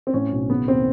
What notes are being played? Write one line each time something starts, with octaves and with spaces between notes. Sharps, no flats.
C4
A2 C#4
B1
C#3 B3
D#2 C4